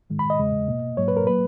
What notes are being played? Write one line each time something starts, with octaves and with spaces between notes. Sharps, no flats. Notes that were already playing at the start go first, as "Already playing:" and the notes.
G#2 D#3 G#3
B5
D#5
E2 C#3 G#3
B2 A#3
G#2 F#3 A#3 C#5
B4
A#4
F#3 A#3 B4